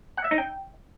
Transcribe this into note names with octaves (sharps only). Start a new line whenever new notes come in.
F#5
E5
D#4
G5